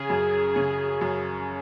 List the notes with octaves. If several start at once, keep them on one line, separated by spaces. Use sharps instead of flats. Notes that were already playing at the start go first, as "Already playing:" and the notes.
Already playing: C#3 G#4
F#2
C#3
F#2